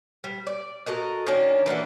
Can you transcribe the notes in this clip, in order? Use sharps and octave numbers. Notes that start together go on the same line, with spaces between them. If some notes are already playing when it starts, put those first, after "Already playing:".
G3
D5
F#4 A4 A#4 D#5
D#3 A#3 C#4 D4
E3 A#3 D4 F#4